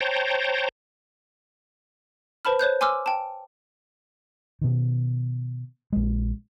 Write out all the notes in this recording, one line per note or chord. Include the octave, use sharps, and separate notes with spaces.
C5 C#5 G5 A5 A#5
B4 C5 A5 B5 F6
C5 C#5 F#6 G6
G#5 C6 D6 E6 F6
G5 A5
B2 D#3
A#1 G#3